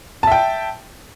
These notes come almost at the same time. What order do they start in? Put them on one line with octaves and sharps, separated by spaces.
A5 E5 G5